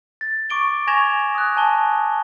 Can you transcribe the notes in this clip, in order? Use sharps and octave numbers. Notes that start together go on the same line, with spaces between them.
A6
C#6 D6 D7 G7
G#5 C#6 G#6 A#6 E7 F7
D#6 F#6
G#5 A5 G7